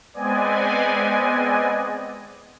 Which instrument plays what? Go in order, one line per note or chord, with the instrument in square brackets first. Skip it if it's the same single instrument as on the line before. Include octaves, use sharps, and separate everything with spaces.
[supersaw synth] G#3 B3 C4 D5 D#5 G#5